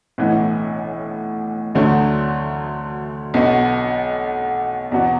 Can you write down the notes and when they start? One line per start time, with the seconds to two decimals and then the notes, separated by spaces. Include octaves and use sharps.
0.18 B1 A2 E3 B3 E4
1.75 D2 D3 F#3 A3
3.34 B1 B2 B3 F#4
4.92 E2 B2 F#3 B3 F#4